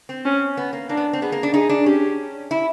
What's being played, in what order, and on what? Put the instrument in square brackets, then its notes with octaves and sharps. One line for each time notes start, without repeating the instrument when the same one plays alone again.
[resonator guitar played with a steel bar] C4
[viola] C#4
[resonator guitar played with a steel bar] B3
A#3
[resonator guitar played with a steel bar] A#3 [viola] D4
[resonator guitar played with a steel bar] B3
C4
[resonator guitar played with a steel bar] B3 [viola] G#4
[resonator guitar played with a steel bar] A#3
D4
[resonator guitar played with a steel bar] D#4 [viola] G#4
[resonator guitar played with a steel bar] D4
[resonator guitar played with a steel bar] C#4 [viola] G4
[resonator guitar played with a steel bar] E4